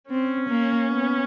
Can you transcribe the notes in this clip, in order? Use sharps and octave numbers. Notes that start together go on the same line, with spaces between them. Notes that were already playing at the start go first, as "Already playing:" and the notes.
C4 C#4
A#3
B3